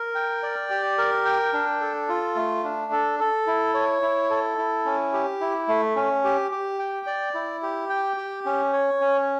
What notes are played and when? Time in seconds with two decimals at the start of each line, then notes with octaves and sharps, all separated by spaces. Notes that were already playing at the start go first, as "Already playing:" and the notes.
Already playing: A#4
0.15 G5
0.43 D5
0.70 G4
0.98 A#4
1.25 G5
1.53 D4
1.81 A4
2.09 F4
2.36 A3
2.64 D4
2.92 A4
3.19 A4
3.47 E4
3.74 C#5
4.02 E4
4.30 A4
4.58 E4
4.85 C#4
5.13 G4
5.41 E4
5.68 A3
5.96 C#4
6.24 G4
6.51 G4
6.79 G5
7.07 D5
7.35 E4
7.62 G4
7.90 G5
8.17 G4
8.45 C#4
8.73 C#5
9.00 C#4